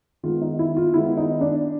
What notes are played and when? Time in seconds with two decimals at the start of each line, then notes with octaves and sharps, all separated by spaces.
0.23 D#3 G#3 B3 F4
0.41 D#4
0.59 E4
0.77 F4
0.94 D#3 G#3 B3 E4
1.17 D#4
1.41 D4